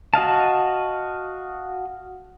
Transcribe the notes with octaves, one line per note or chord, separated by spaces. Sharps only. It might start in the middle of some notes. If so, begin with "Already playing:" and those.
F#4 D#5 F5 A5